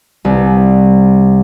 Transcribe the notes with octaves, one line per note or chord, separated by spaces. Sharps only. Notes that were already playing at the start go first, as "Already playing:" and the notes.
C2